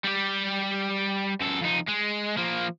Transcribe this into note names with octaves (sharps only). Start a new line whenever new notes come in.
G3 G4
F#2 A4
F2 D#4
G#3
F3 A#3